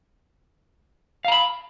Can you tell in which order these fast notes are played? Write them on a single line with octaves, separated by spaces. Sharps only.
F5 A#5 B5